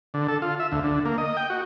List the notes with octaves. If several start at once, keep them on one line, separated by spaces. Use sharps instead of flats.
D3
A4
F4
E5
D2
D3
A#3
D#5
G5
F#4